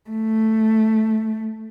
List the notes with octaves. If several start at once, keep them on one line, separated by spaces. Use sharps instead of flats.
A3